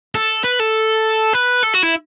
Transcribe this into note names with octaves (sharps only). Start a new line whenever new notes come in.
A4
B4
A4
B4
A4
F#4
E4